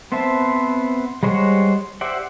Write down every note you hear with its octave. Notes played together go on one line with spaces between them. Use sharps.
B3 C4 C5 E5 A5
G3 G#3 C5 C#5 F#5
G4 C5 D5 E5 F#5